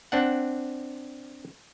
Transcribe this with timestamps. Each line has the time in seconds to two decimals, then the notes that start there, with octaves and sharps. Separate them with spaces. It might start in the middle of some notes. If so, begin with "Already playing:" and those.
0.12 C4 D4 F#5